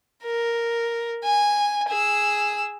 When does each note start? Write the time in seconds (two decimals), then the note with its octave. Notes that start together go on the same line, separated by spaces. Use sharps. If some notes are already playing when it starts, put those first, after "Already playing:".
0.23 A#4
1.24 G#5
1.88 G#4 E6